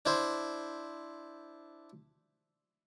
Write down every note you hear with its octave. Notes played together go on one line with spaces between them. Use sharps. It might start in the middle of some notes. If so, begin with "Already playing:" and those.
D4 E4 C5